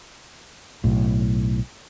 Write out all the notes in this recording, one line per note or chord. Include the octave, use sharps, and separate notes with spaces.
B1 A2